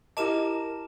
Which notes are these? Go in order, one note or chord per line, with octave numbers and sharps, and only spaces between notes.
E4 G4 A#4 D#5 A5 D6 E7